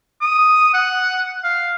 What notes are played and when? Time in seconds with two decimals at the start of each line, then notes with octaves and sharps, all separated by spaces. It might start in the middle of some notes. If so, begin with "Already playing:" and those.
0.21 D#6
0.74 F#5
1.44 F5